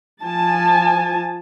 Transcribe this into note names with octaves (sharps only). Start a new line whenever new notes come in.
F3 G#5 A5